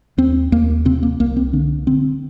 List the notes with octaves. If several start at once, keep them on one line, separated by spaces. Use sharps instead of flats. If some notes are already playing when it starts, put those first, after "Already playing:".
D#2 C4
D#2 A#3
C3 C4
A#3
C2 A#3
C4
D3 D4
D3 C4